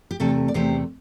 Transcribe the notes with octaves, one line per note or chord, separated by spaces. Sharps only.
G4
E2 C3 A3 A4
D5
E2 C3 A3 G4 C5